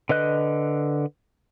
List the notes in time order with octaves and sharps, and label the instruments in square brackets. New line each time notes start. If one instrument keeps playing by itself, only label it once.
[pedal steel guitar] D3 B4 D#5 F#6